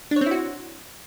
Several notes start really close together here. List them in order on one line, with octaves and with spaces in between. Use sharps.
D4 C#5 C4 E4 F#4